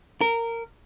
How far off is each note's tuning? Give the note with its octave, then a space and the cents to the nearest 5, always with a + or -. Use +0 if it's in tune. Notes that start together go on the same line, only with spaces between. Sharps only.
A#4 -15